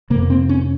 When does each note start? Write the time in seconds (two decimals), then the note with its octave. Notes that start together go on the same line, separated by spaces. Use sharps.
0.10 C3 A#3
0.14 F2
0.30 C4
0.49 C#4